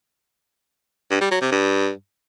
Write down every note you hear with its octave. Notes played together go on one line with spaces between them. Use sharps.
G2
G3
F#3
C3
G2